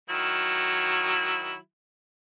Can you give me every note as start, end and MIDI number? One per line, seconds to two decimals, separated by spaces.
0.10 1.57 51
0.10 1.57 54
0.10 1.57 64